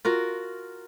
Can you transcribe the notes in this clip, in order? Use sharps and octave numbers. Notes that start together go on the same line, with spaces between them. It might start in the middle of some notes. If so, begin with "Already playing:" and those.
F4 F#4 A#4